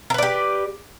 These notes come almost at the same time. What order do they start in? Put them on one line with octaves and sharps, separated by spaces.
A#4 B4 D5 G4